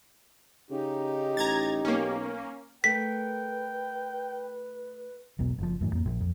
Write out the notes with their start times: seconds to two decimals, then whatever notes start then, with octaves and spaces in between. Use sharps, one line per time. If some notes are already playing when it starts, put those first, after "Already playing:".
0.71 C#3 D#4 G4
1.37 A1 A#5 G#6 A6
1.85 B1 A#3 C#4
2.84 A3 A#4 B4 G5 B6
5.39 E1 B1 B2
5.58 F#1 F3
5.81 F#2 A2 E3
5.93 F2 A#3
6.06 A#1
6.21 F2